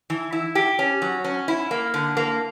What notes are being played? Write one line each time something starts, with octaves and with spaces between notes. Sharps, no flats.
E3
E4
G4
C#4
F#3
C#4
E4
A#3
D3
A#3